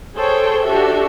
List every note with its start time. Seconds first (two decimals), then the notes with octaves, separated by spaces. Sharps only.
0.14 G#4 A4 C5 C#5 G5
0.65 D4 F#4 G4 A4 E5